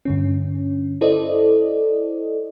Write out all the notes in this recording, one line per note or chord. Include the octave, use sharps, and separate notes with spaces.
G2 D3 C#4
E4 A4 C5 D5 D#5